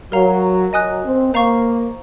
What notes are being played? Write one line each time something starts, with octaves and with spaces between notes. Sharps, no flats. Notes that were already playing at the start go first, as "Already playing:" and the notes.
F#3 A#4 F5 A#5
F#3 D#5 G#5 D#6 F#6
C4
A#3 C5 F5 A#5 C#6